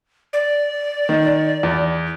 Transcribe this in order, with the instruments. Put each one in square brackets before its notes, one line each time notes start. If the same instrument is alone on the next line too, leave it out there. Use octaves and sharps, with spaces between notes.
[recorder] D5
[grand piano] D#3
E2